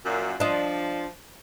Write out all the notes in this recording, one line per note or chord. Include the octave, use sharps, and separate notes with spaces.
F#2 A#2
F3 D4 D#5